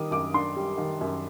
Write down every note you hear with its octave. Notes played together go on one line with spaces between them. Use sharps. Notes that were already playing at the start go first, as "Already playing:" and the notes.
Already playing: D#3 G3 D6 D#6
F#2 D6
D4 C6
G3
D#3
F#2